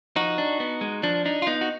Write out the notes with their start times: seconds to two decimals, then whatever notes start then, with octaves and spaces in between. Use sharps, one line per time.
0.16 F3 D#4 F#4
0.38 D4
0.60 B3
0.81 G#3
1.03 F3 D4
1.26 D4 D#4
1.42 F4
1.47 B3 D#4
1.61 F#4